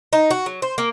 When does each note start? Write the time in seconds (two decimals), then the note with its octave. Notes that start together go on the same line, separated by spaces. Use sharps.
0.13 D#4
0.31 F#4
0.46 F#3
0.62 C5
0.78 A#3